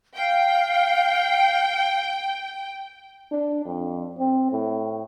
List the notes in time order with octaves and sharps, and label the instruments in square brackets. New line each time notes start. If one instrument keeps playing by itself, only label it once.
[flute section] F5 [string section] G5
[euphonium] D4
F2
C4
A2